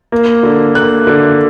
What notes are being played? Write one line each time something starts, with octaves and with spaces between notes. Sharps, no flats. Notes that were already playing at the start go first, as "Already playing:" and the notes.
A#3
D3
A#3 F#6
D3